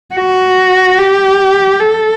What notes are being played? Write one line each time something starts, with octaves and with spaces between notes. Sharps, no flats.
F#4
G4
A4